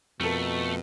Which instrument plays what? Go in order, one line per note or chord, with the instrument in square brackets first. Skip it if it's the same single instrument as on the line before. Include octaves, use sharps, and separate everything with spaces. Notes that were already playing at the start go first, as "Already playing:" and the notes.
[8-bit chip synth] F2 [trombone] B2 [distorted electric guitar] A3 [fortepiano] A4 A#4